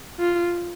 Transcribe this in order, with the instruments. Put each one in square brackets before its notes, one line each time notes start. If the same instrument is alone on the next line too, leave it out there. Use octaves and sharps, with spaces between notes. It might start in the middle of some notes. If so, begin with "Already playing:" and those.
[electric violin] F4